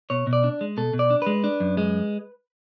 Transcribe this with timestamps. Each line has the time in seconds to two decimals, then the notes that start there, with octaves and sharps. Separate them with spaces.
0.10 B2 C#5
0.27 B2
0.33 D5
0.44 D4
0.61 G#3
0.77 B2 A4
0.93 B2
0.99 D5
1.10 D4
1.22 G#3 B4
1.44 D4
1.60 F#2
1.77 G#3